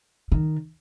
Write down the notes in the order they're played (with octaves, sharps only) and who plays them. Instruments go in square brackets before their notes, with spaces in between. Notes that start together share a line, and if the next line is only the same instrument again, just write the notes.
[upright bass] D#3